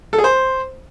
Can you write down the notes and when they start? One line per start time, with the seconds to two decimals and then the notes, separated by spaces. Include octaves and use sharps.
0.13 A4
0.18 G#4
0.24 C5